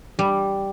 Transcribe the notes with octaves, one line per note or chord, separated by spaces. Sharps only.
G3